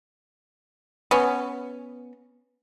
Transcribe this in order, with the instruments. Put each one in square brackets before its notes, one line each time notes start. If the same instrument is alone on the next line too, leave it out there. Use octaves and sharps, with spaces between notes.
[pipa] B3 C#4